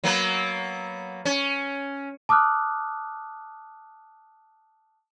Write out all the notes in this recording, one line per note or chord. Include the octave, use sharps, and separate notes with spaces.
F#3 A#3 B3
C#4
A5 D6 D#6 F6 F#6